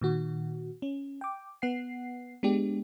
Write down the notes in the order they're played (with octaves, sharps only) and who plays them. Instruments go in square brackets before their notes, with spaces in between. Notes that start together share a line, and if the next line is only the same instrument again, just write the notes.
[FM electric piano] A#2 D#3 F#4
C#4
G5 D6
B3 F#5 C7
G#3 B3 D4 G4